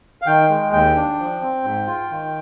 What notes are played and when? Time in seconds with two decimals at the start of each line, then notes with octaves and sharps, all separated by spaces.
0.22 F5
0.27 D#3 G5
0.49 G#3
0.72 D#2 G5
0.96 D4
1.19 F3
1.42 C4
1.64 G#2
1.87 F4
2.10 D#3